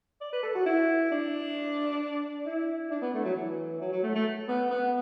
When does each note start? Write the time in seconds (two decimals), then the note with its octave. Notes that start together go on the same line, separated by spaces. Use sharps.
0.21 D5
0.33 B4
0.43 A4
0.55 F#4
0.66 E4
1.11 D4
2.46 E4
2.91 D4
3.02 B3
3.14 A3
3.25 F#3
3.35 E3
3.81 F#3
3.92 F#3
4.03 A3
4.15 A3
4.48 B3
4.71 B3